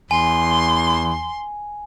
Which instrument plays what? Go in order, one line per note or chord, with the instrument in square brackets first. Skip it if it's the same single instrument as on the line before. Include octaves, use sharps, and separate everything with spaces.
[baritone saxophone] E2 [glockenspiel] G#5 [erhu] C6